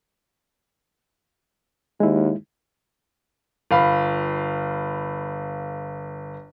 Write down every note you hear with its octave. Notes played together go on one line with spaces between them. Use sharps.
D#2 G#3 E4
G1 F5 B5